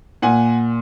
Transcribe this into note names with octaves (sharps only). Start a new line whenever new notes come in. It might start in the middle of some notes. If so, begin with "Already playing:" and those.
A#2 F#5 G#5